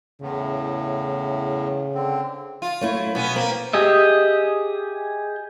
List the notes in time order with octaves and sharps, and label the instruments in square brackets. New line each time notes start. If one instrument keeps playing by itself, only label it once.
[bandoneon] E2 A2 [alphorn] C#3
[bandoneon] D3 C4
[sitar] F4
[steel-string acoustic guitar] F#3 A3 E4
[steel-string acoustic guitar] B2 [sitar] B3 C#4
[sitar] A#3 [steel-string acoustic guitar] C4
[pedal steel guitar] G4 G#4 D#5 E5